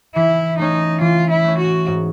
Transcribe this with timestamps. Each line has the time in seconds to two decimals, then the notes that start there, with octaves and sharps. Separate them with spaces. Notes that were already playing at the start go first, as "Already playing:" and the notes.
0.15 E3 E4
0.58 A3 C#4 D#4
1.01 E3 F4
1.30 E4
1.44 A3 C#4
1.58 F#4
1.87 G#2